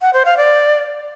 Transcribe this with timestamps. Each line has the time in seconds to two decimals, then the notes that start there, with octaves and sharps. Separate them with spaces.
0.02 F#5
0.13 C5
0.25 F5
0.37 D5